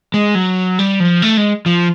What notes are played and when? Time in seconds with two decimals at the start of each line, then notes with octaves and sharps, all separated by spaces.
0.14 G#3
0.35 F#3
0.79 G3
1.00 F3
1.22 A3
1.37 G#3
1.66 F3